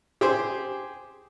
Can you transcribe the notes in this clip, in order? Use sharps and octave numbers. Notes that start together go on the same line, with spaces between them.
G4 G#4 C5